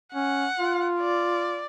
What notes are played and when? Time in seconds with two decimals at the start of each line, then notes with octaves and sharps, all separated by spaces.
0.14 C#4 F#5
0.60 F4
1.01 D5